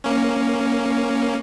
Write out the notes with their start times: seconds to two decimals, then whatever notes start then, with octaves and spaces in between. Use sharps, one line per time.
0.04 A#3 C#4